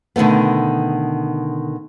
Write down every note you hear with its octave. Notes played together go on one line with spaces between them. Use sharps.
B2 D3 D#3 A3 B3